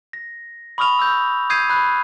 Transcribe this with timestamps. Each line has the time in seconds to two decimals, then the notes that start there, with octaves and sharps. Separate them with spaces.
0.13 A#6
0.78 B5 C#6 D#6 F6 F7
0.99 E6 G6
1.50 D#6 G6 G#6 C7 D#7
1.70 B5 F#6